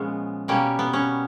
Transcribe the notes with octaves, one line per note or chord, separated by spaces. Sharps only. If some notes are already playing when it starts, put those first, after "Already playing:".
Already playing: A#2 F3 G#3 B3 C#4
B2 G3 A#3 C#4
B3
C#4